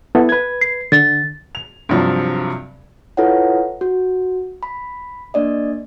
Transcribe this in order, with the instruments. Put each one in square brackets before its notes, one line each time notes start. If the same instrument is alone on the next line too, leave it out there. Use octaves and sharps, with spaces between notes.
[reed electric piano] B3 E4 A4
B4 G#6
[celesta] C7
[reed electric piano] D3 [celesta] A6
[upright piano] F7
G2 C3 F3 F#3
[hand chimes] E4 F4 A4 B4 C#5 F#5
F#4
B5
A#3 D4 D5 D#5